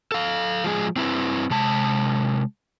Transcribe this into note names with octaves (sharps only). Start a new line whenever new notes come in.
A4 F5
F3 G#3 G#4
C4 E4 B4
C3 G#3 A5